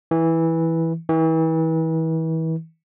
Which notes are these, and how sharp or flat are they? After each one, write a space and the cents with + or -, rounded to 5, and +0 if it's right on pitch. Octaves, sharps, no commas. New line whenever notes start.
E3 -10
E3 -35